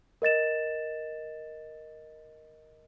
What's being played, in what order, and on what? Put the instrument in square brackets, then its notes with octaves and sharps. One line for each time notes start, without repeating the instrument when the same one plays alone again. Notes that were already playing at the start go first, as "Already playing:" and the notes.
[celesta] A#4 D#5 A6 E7